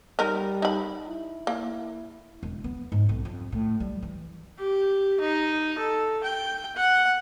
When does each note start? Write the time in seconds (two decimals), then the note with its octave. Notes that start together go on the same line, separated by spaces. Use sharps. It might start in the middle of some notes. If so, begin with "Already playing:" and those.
0.19 G3 D#4 A#4
0.62 D#4 B5
1.08 E4
1.47 A#3
2.43 E1
2.64 B3
2.92 G#2
3.09 B1
3.25 F2
3.52 A2
3.80 G3
4.02 E3
4.59 G4
5.20 D#4
5.78 A4
6.23 G5
6.76 F#5